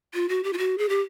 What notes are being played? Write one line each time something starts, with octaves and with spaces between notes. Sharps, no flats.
F4
F#4
G4
F4
F#4
G#4
G4